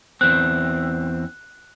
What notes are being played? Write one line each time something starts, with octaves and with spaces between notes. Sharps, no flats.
E2 C4 F#6